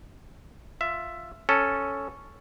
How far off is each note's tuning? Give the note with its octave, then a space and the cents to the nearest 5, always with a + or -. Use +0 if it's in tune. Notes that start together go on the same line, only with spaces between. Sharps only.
F4 +5 E5 +10
C#4 +0 A4 +0